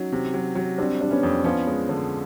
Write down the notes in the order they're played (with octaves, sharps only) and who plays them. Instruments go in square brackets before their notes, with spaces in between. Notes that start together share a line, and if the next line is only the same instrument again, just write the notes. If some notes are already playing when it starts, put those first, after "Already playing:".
Already playing: [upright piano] F#3 [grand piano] C#4 D#4
[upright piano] C3
F#3
F#3
[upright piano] G3 [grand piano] C4 D4
[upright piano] G3 [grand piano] D4
[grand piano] B3 C#4
[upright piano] F2
[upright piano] F3 [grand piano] B3 C#4
[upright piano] G#3
D3